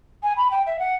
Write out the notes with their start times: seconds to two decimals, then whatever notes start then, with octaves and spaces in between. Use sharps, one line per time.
0.23 G#5
0.37 B5
0.51 G5
0.67 E5
0.79 F#5